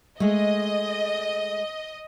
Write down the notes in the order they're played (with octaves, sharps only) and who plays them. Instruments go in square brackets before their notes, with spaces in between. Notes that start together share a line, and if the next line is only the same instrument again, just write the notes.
[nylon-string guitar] G#3 A3 [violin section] D#5